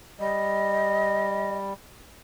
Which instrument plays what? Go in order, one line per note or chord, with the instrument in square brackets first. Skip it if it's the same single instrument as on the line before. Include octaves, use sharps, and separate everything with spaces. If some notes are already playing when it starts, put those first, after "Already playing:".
[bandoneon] G3 [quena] D#5